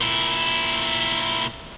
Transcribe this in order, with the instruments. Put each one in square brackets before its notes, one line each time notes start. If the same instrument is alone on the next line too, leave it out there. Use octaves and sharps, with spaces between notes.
[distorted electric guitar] A#2 E4